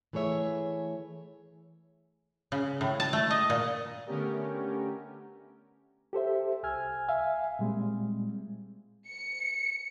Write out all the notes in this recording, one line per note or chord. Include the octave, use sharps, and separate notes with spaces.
E3 A3 G#4 C#5 E5
C#3
A2
A5
A3
D#5
A#2
D3 A3 B3 C#4 G4 A#4
G4 A4 C5 E5
C2 G#5 E6 F6 G#6
E5 F5 G#5
A#2 G3 G#3 C4
C#7